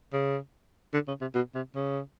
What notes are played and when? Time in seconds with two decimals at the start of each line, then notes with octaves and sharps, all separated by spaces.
0.13 C#3
0.94 D3
1.08 C#3
1.21 C3
1.35 B2
1.55 C3
1.75 C#3